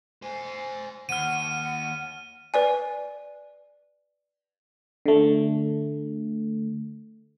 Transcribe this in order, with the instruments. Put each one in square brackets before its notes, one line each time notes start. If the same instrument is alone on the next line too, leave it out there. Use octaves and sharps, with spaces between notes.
[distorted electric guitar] C5 G#5
[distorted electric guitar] D#2 [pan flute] F#5 [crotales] F6 D#7
[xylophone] B4 D5 G#5
[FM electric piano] D3 A3